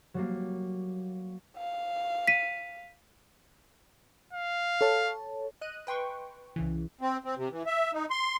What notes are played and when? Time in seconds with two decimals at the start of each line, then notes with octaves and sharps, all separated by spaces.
0.14 F#3 G3 A#3
1.57 F5
2.27 B6 D#7
4.33 F5
4.81 A4 C#5 A5
5.61 D#5 F#6 D#7
5.87 B4 G5 C6 C#6
6.56 C2 C#3 E3
7.01 C4
7.24 C4
7.37 C3
7.51 E3
7.66 E5
7.93 D#4
8.10 C6